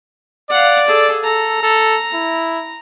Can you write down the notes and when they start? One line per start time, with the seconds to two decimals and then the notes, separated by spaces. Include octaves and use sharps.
0.50 D5 F5 F#5
0.88 G#4 A4
1.24 A4 A#5
1.63 A4
2.14 E4